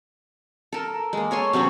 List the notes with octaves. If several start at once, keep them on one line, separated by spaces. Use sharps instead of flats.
A4 A#4
G#3 A#3
A4 C#5 G#5 C6
C3 F#3 B3 C#4